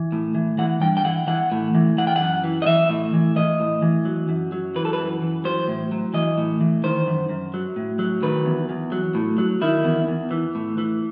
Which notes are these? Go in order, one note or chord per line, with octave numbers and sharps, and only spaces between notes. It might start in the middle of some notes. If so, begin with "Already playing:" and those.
Already playing: E3
A2
E3
E3 F#5
G2 G5
G5
E3 F#5
E3 F#5
A2
E3
E3 F#5
G5
F#5
F#2
E3
D#5
E3 E5
A2
E3
E3 D#5
A2
E3
F#3
F#2
F#3
E3 B4
A4
B4
F#2
E3
F#3 C5
A2
F#3
E3 D#5
A2
E3
D#3 C5
F#2
F#2
F#3
A2
F#3
D#3 B4
E2
E2
F#3
A2
F#3
D#3 E4
E2
E2
E3
A2
E3